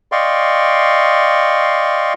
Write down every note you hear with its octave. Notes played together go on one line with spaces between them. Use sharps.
D5 D#5 F5 G5 C6 C#6